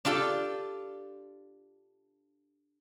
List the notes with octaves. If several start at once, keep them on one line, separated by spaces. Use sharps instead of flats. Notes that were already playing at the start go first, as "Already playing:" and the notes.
D4 F4 G4 A4